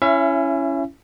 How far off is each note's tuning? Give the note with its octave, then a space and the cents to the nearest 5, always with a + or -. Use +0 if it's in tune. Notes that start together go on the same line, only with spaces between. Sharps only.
C#4 +0 E4 +15 E5 +35